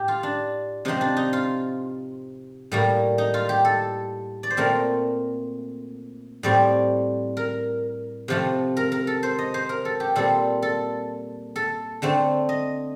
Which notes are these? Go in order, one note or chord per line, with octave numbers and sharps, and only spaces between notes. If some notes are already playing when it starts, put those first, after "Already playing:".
Already playing: A2 G4
F4
D4
C3 F3 C4 D#4
D4
D#4
F4
A2 G3 A#3
D#4
F4
G4
A4
D5
C5
A#2 A3 C4 A#4
A2 G3 C4 D5
A#4
C3 F3 A3 C4
A#4
A#4
A4
C5
D#5
C5
A#4
A4
G4
A#2 G3 C4 A4
A4
A4
D3 A3 C4
D#5